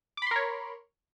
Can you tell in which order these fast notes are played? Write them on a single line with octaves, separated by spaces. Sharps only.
D6 B5 C6 A#4 C#5